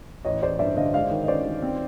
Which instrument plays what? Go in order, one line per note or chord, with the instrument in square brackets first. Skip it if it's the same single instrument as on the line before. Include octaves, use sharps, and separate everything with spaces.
[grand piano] A1 [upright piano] C#5 D#5
[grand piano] A1 [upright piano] C5 D5
[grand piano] G2 [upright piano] D5 E5
[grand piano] D3 [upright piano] D#5 F5
[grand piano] G#3 [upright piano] D#5 F5
[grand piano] D#3
[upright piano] D#5
[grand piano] C#4 [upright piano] C5 D5
[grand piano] D#3
C4